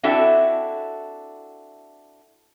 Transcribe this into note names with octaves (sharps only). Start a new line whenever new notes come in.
C4 D4 E4 F#4 A4 E5